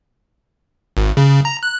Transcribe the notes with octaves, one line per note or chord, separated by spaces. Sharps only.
G#1
C#3
A#5
F#6